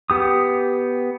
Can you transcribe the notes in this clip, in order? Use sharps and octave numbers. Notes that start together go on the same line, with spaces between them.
B3 G4 D#6